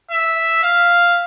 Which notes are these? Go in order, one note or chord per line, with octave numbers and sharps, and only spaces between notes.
E5
F5